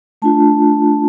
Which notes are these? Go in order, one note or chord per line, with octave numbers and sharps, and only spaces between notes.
A3 D4 F4 A5